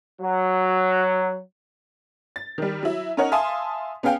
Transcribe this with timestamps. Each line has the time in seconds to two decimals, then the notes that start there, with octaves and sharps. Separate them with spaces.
0.20 F#3
2.36 A6
2.58 D#3 G3
2.83 F#3 E4
3.17 C#4 D#4 A#4 C#5 F#5
3.32 E5 F5 G#5 A5 C6 D#6
4.03 B3 C#4 G#4 F5 G5